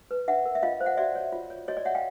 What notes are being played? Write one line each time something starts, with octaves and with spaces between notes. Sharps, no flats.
B4
D4 E5 F#5
A#4
E5
F4 D#5 F5
C5
E5 F#5
F#4 D5 E5
C#5
F4
C#5
F#4 C#5 D#5
D5
C#5 E5 F#5
F5 G5